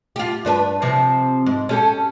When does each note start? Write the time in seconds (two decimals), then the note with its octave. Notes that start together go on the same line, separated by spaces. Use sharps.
0.16 F4 G4
0.45 G2 D4 B4
0.82 C3 F3 C4
1.46 G#2
1.69 C#4 G4 A4